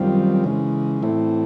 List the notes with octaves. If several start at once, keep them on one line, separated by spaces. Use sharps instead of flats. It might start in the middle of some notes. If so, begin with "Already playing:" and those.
Already playing: F#2 D#3 G3 C4 F4
C#3 E3 G#3
A2 E3 A3 C4 E4